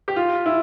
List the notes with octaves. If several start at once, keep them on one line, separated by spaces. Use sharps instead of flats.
G4
F4
E4